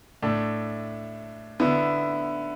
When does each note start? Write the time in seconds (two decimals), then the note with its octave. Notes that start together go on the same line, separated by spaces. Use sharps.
0.22 A2 A3 D4
1.60 D3 B3 E4